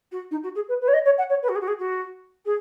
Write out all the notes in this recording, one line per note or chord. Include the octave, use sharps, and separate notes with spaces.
F#4
D#4
F#4
G#4
B4
B4
C#5
D#5
C#5
F#5
C#5
B4
F#4
G#4
F#4
G#4
F#4
G#4